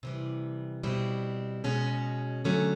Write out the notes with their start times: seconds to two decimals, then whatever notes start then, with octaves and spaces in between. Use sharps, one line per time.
0.03 C3 E3 G3
0.83 B2 G3 C4 E4
1.64 B2 G#3 C#4 F#4
2.44 D#2 D3 F#3 A3 C#4